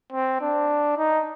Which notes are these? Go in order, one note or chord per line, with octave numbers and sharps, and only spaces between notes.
C4
D4
D#4